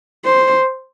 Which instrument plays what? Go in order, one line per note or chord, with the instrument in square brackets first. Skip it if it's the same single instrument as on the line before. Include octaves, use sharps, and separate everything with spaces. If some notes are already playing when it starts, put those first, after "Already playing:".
[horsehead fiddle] C5